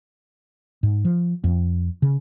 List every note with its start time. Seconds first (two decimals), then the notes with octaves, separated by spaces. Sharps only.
0.83 G#2
1.05 F3
1.44 F2
2.02 C#3